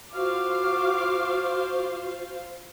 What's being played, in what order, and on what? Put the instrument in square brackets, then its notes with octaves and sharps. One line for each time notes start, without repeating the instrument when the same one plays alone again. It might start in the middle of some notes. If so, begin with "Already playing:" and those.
[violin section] F4 C5 F5 [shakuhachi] F#4 [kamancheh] D6 [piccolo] F6